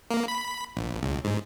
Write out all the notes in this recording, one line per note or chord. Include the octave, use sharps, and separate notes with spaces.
A#3
B5
A#1
C#2
G#2